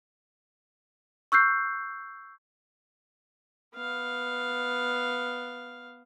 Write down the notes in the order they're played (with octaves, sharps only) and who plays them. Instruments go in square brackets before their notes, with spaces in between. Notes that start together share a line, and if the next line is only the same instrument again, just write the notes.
[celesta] C#6 E6 F#6 G6 C7
[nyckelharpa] B3 F5